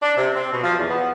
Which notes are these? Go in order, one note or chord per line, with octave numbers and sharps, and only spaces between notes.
D4
C3
C4
B2
F3
E2
B3